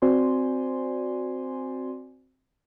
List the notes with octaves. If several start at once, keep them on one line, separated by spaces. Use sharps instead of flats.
C4 F#4 C5 D5 G#5 C6